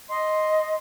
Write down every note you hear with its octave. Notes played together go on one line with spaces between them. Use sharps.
D#5 C6